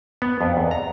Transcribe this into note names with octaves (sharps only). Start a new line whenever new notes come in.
B3
F2
E2
A#5